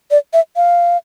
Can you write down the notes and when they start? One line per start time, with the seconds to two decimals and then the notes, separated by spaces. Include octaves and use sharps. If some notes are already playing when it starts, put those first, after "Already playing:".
0.11 D5
0.33 E5
0.56 F5